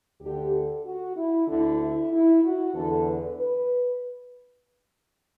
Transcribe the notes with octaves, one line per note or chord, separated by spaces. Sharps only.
D2 D3 G4
A4
F#4
E4
D2 D3 E4
E4
E4
F#4
E2 D3 A4
B4
B4